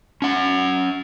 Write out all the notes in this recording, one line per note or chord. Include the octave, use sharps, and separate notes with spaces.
C#4 F#5